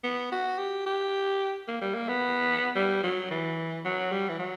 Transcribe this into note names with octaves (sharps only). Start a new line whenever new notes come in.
B3
F#4
G4
G4
A#3
G3
A#3
B3
G3
F#3
E3
F#3
G3
E3
F#3